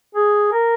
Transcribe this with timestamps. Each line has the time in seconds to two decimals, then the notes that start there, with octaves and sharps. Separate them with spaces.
0.15 G#4
0.53 A#4